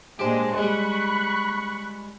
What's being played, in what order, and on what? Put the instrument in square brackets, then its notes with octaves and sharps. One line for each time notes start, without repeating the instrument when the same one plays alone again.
[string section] A#2 G#3 D4 [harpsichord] G4 C5
[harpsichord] G3 G#3 [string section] B5 C#6 F#6